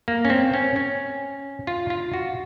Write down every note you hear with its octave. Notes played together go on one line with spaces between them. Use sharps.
A#3
C#4
C4
C#4
C#4
F4
F4
F#4